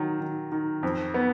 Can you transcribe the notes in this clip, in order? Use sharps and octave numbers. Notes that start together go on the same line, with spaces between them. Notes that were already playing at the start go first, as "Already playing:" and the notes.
Already playing: D#3 F#3
D#3
D#3
F2
B3